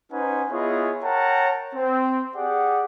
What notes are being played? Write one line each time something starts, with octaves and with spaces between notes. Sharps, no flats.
C#4 D#4 B4 C5 F#5 G#5
B3 E4 F4 G#4 C#5 D#5
A#4 C#5 F#5 G5 A5 A#5
C4
G4 G#4 D5 F#5